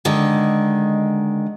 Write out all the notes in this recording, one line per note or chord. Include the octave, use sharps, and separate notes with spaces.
D3 D#3 G#3